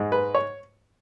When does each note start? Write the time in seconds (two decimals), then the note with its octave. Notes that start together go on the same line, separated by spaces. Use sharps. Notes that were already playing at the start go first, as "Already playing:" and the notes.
Already playing: G#2 G#3
0.12 B4
0.35 C#5